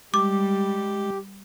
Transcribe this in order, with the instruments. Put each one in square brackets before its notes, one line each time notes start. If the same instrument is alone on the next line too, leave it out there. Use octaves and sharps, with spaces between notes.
[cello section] G3 [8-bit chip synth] G#3 [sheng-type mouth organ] G4 [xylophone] D6